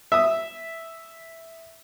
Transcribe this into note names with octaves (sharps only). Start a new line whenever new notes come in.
E5 D#6